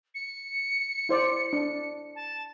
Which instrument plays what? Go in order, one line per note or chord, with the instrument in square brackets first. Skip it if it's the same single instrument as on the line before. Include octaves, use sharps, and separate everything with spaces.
[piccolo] C#7
[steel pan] E4 C5 D5
D4
[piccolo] A5